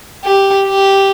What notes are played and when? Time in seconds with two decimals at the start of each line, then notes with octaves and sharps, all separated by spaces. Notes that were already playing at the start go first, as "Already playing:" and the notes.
0.25 G4
0.68 G4